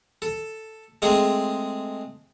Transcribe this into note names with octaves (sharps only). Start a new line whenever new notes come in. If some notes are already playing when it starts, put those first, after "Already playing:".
A4
G#3 A3 C4 G#4